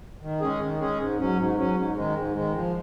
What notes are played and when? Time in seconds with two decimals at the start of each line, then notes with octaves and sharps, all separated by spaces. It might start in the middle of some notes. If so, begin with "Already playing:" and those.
0.22 D#3
0.40 G#3 C#4 G#4
0.60 D#3
0.79 G#3 C#4 G#4
0.98 G#2
1.18 F#3 C#4
1.37 G#2
1.56 F#3 C#4
1.75 G#2
1.95 D#3 G#3
2.14 G#2
2.33 D#3 G#3
2.53 F3